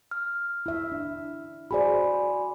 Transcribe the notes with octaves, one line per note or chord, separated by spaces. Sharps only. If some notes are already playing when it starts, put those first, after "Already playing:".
F6
E4 E5
D4
F#4 G#4 C5 D5 G#5 B5